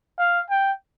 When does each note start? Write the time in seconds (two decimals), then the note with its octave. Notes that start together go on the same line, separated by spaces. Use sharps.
0.19 F5
0.50 G5